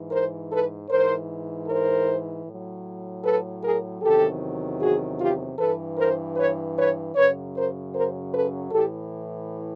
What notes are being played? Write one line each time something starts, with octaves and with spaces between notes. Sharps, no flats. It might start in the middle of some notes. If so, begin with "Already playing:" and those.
Already playing: G#2 E3
A#4 C5
A4 B4
G#2 E3 A#4 C5
A#4 C5
A2 F#3
A4 B4
G#4 A#4
E2 C3 D#3 F#3 G4 A4
F#4 G#4
F4 G4
G2 E3 A4 B4
A#4 C5
B4 C#5
B4 C#5
F#2 C#3 F#3 B4 C#5
A#4 C5
A#4 C5
A4 B4
A2 E3 G4 A4